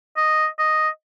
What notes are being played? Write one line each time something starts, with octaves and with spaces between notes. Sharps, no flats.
D#5
D#5